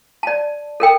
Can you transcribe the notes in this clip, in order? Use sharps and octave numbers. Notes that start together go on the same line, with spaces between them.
D5 A5
A4 A#4 G5